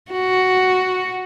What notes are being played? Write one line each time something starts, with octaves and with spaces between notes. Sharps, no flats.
F#4